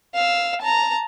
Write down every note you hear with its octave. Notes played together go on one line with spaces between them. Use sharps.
F5 E6
A5 A#5